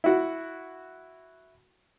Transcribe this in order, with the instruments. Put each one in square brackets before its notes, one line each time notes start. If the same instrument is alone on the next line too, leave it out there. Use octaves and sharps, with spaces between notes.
[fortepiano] E4 F#4